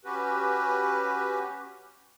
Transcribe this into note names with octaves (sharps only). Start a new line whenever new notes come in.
C#4 F#4 G4 B4